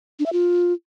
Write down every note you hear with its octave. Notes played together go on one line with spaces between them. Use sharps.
D4
E5
F4